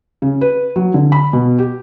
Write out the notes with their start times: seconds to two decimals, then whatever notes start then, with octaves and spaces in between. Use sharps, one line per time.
0.22 C#3
0.41 B4
0.76 F#3
0.94 D3
1.12 B5
1.33 B2
1.59 G4